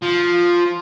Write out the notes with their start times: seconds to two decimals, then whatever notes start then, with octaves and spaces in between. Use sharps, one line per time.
0.02 F3